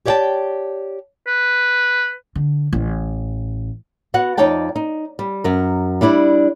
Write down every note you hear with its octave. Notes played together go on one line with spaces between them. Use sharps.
G4 C#5 D5 F#5 G5 A5
B4
D3
A1
B3 F#4 F#5
F2 D#4 C#5 D5 G5 A5
D#4
G3
F#2 A#4
G3 D4 E4 D5